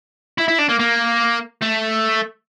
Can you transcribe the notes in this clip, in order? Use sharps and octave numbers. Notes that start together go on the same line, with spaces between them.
E4
E4
D4
A#3
A#3
A3